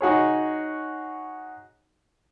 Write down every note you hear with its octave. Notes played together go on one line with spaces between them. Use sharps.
D#4 F#4 G#4 C#5